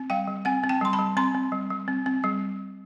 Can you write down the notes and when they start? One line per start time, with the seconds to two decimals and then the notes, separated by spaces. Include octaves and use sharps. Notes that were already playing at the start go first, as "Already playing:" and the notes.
Already playing: C4
0.10 G3 F5 G5
0.28 G3
0.45 C4 F#5 G#5
0.64 C4
0.69 G5 A5
0.81 G3 C6
0.93 A5 B5
0.99 G3
1.17 C4 A#5 C6
1.35 C4
1.52 G3
1.70 G3
1.88 C4
2.06 C4
2.24 G3